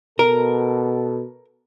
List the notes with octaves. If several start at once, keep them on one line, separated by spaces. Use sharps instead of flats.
B2 A4 A#4